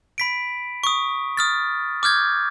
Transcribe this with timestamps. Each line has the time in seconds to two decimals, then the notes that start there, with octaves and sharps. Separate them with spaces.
0.18 B5 B6 D7
0.84 C#6 D#6
1.37 D#6 F6 A6
2.03 D6 F6 G6 G#6